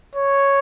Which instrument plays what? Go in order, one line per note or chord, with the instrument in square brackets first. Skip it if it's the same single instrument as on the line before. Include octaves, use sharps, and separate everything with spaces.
[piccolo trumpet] C#5